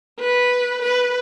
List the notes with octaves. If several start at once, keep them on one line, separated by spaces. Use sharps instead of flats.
B4
B4